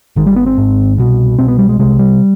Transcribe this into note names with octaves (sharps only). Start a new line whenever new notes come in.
G#1 G#2 D#3
G3
B3
C4
G#1 G#2
C2 B2
C2 B2 C4
B3
G3
G#3
C2 C3 G#3
G3